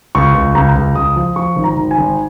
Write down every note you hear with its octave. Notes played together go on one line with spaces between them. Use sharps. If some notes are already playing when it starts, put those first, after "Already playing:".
C#2 C#6
C#2
C#2 A#5
C#2
C#2 D#6
F3
F3 C#6
G#1
A#5
G#1
G#5
G#1